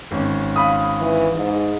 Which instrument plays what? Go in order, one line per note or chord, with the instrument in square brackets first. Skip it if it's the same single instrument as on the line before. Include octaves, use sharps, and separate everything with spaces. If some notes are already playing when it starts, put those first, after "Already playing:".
[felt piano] G#1 C#4
[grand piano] F5 B5 D#6
[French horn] E3
G#2